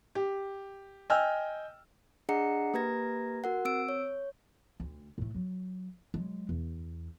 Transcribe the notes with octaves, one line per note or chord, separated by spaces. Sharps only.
G4
D#5 G5 G#5 E6 F6
D4 G#4 D#5 F#5 A#5 C#7
A#3 G4 B4 A#5 G#6 A#6
F#4 A#4 F#5
C4 E6 D7
C#5
D2
A2 A3
F#3
F#3 G#3
E2